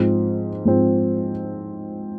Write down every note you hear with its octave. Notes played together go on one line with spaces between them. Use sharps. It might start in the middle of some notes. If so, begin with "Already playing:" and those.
Already playing: G#2 F3 C4
G#2 F3 C4